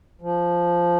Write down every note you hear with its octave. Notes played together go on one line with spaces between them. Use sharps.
F3